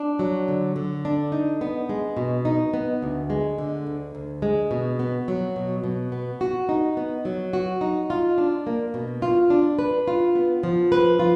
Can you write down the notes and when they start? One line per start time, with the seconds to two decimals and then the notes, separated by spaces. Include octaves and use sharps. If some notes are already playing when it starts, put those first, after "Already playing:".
Already playing: D4
0.19 F#3
0.48 D3
0.76 D3
1.05 D4
1.32 D#4
1.61 B3
1.89 G#3
2.17 B2
2.45 D#4
2.74 B3
3.02 D2
3.30 G#3
3.58 D3
3.87 D2
4.15 D2
4.42 G#3
4.71 B2
4.99 B3
5.28 F#3
5.56 B2
5.84 B2
6.12 B3
6.41 F#4
6.69 D#4
6.97 B3
7.25 F#3
7.53 F#4
7.81 D#4
8.10 F4
8.38 D4
8.67 A#3
8.94 B2
9.22 F4
9.50 D4
9.79 B4
10.08 F4
10.35 B3
10.64 F3
10.92 B4
11.19 F4